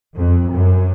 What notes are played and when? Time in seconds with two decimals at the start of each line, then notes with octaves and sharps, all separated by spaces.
0.17 F2
0.53 F#2